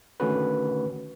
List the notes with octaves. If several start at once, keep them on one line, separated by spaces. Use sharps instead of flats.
D3 D#3 A3 C#4 F#4 B4